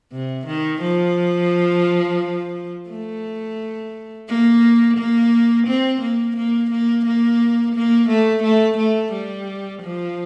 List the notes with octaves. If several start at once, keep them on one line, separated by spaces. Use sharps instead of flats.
C3
D#3
F3
A3
A#3
A#3
C4
A#3
A#3
A#3
A#3
A#3
A3
A3
A3
G3
F3